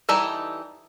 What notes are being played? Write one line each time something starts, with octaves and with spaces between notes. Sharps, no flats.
E3 G3 D#4 E4 A4